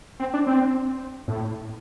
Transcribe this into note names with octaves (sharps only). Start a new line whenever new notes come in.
C4
D4
C4
A2